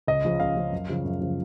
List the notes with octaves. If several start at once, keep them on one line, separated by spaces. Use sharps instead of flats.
C#2 D#5
C#3 F3
C#2 F5
C#3 F3
F#2
C#3 F3
F#2
C#3 F3